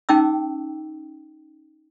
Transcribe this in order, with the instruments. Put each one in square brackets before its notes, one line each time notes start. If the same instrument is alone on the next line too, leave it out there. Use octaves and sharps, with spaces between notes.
[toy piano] C#4 D#4 G5 D6 E6